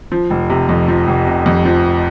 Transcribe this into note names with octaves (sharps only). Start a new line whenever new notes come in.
F3
F1
C3
F2
F3
F1
C3
F2
F3